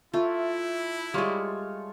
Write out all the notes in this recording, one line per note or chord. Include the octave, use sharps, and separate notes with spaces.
A3 E4 F4
G3 G#3 F4 C#5